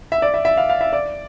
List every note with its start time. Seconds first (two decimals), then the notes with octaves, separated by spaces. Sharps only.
0.12 E5
0.22 D5
0.34 E5
0.45 E5
0.57 F5
0.70 F5
0.81 E5
0.93 D5